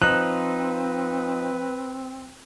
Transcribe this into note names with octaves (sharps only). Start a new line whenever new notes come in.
F3 C4 D#4 B4 F#6